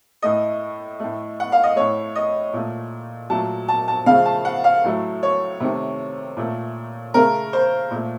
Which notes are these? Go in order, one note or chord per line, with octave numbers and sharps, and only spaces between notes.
A2 A3 D#5
A2 A3
F#5
F5
D#5
A2 A3 C#5
D#5
A#2 A3
A#2 F#3 A3 A5
A5
A5
C#3 F3 A3 F5
A5
F#5
F5
A2 F#3 A3
C#5
C3 D#3 A3
A#2 A3
C#3 A3 A#4
C5
A#2 A3